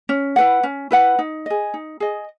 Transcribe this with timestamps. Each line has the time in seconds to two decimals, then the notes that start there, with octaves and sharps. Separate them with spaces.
0.09 C#4
0.36 E4 B4 F#5
0.63 C#4
0.91 E4 B4 F#5
1.19 D#4
1.46 G#4 D#5
1.74 D#4
2.00 G#4 D#5